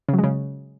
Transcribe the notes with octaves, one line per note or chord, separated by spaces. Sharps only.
C#3
F#3
G#3
C#3